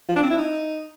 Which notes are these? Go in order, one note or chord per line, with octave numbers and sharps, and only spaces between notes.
F3
D4
C4
E4
D#4